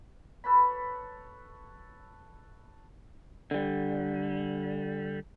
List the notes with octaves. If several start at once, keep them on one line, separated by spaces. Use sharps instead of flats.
A4 B4 C#5 B5
D3 G3